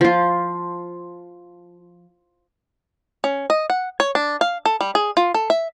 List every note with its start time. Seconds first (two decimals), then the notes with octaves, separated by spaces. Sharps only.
0.01 F3 F4
3.24 C#4
3.50 D#5
3.70 F#5
4.00 C#5
4.15 D4
4.41 F5
4.65 A4
4.81 G3
4.95 G#4
5.17 F4
5.34 A4
5.50 E5